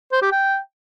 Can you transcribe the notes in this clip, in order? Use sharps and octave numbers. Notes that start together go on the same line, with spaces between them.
C5
G4
G5